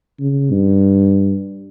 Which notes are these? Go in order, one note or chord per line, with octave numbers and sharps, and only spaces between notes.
C#3
G2